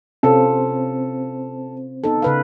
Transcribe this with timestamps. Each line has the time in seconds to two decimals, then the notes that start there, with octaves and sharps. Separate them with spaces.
0.23 C3 C4 C#4 F4 A4 C5
2.04 B3 D#4 A4
2.22 C#3 B4 F5